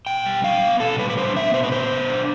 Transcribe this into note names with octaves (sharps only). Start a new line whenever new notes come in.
B2 G5
G3
D4 F5
B3
B2 A4
G3 B4
B4
D4 C5
B3 E5
B2 C5
B4
B3 C5
B2
D4